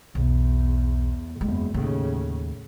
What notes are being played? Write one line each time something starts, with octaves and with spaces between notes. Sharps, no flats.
B1 E2
F#1 E2 G#3
D#2 A2 C#3